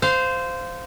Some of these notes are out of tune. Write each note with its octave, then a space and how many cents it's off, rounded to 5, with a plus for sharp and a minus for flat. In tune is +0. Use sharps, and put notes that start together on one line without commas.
C5 -15 F5 +0